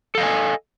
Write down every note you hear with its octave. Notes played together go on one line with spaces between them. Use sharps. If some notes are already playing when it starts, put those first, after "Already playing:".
A4 D#5 F5 G#5